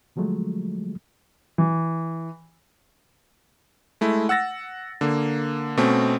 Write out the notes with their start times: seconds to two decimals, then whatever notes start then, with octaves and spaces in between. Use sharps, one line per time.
0.16 D3 F3 F#3 G#3 A3
1.58 E3
4.01 G#3 A3 E4
4.29 F#5 E6 A6 A#6
5.01 D3 A#3
5.77 B2 A3 C4 C#4